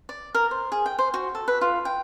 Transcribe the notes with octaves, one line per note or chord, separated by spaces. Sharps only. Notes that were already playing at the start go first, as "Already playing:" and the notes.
D5
A#4
C5
G#4
G5
C5
F#4
A4
B4
F4
G5